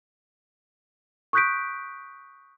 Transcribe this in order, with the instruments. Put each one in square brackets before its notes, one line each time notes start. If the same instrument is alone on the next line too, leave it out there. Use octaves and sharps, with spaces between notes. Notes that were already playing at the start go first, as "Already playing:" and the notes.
[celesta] C#6 D#6 F#6 G6 B6 D7